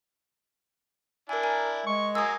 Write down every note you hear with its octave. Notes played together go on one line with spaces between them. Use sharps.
D4 E4 A#4 G#5
A#4 G#5
G#3 C#6
F#3 A#3 G#4 D#6 E6